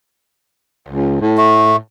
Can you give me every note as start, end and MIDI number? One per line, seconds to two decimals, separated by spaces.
0.88 1.19 37
1.21 1.76 45
1.37 1.76 57